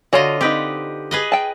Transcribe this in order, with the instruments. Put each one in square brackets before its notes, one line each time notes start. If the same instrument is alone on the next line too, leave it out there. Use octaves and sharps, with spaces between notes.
[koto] D3 F4 D#5 [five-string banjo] F#4 C#5 A5
[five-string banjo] C4 D#4 [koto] G4 B4
[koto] G#4 B4 D#5
[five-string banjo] G5 A5